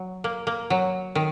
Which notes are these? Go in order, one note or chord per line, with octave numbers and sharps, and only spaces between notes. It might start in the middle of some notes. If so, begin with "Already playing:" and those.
Already playing: F#3
A#3
A#3
F#3
D#3